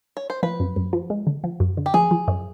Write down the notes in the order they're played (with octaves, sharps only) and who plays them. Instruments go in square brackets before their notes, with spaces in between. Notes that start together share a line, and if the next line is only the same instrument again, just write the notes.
[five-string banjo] C#5
C5
[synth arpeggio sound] F3 [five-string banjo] B4
[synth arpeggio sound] F#2
F#2
F3
G#3
D3
F3
F#2
D3
[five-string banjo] G4
[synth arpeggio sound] F3 [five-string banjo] G#4
[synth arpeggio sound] F3
F#2